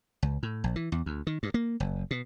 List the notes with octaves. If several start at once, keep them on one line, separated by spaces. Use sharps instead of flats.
C#2
A2
A#1
E3
E2
D2
D#3
G2
A#3
F#1
B2